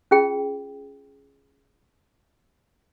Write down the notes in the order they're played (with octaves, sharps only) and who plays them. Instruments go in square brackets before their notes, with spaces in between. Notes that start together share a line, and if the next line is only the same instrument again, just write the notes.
[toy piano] C#4 F4 G#4 G5